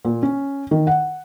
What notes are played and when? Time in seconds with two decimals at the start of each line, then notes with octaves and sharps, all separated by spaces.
0.05 A#2
0.23 C#4
0.71 D#3
0.87 F#5